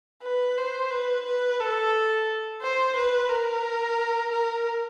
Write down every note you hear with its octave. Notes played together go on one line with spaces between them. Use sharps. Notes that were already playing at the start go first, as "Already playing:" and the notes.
B4
C5
B4
B4
A4
C5
B4
A#4
A#4